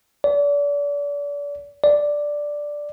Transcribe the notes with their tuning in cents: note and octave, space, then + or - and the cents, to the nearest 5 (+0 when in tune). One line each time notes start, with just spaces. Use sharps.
D5 -35
D5 +0